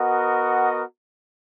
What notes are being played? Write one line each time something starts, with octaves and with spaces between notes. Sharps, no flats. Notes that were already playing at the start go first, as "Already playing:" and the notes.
Already playing: B3 F#4 A#4 D#5 F#5